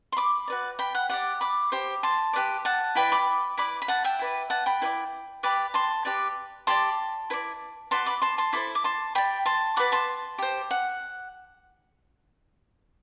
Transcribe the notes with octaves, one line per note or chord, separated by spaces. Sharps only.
C6
B5 D6
F#4 B4 D5
G5 B5
F#5
G4 D5 F#5
B5 D6
G4 C5
A5 C6
G4 B4 D5
F#5 A5
E4 B4 D5 G5 B5
B5 D6
E4 B4 D5 B5 D6
B5
F#5 A5
E5 G5
E4 B4 D5
F#5 A5
G5 B5
E4 B4 D5
G4 B4 D5 B5 D6
A5 C6
G4 B4 D5
G4 D5 A5 C6
E4 B4 D5
F#4 B4 D5 A5 C6
B5 D6
A5 C6
A5 C6
E4 A4 C5 B5 D6
D6
A5 C6
G4 D5 G5 B5
A5 C6
F#4 B4 D5 B5 D6
A5 C6
G4 C5
F#5